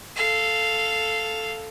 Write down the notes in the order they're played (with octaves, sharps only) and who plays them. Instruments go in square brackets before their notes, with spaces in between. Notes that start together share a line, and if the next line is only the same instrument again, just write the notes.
[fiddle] A4 F5